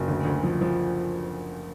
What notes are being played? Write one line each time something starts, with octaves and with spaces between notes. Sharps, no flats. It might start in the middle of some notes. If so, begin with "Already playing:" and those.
Already playing: F#1
D2
D2
F3
F3